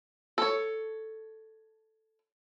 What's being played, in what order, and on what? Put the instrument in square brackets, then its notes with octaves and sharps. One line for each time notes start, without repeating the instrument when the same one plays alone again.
[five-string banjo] A4 C#5